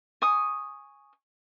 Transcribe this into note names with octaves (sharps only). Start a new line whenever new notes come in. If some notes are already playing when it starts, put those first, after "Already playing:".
G#5 C#6 D#6